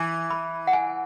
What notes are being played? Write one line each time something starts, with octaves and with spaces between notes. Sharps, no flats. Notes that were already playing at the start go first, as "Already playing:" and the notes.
Already playing: E3 G#5
B5
F#5
G#5